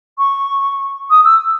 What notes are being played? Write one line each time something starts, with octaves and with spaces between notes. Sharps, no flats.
C#6
D#6
E6